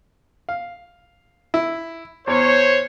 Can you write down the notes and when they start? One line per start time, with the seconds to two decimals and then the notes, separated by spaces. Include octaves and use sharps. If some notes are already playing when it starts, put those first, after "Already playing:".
0.49 F5
1.54 E4
2.27 E2 C5 C#5